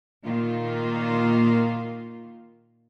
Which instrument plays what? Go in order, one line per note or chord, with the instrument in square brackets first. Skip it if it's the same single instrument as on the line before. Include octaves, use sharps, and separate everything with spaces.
[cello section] A#2 D#3 A#3 F4